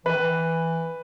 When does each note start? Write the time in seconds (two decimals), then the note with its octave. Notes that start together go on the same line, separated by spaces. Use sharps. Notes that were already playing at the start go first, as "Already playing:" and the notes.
0.05 E3 B4
0.14 D#3
0.21 E3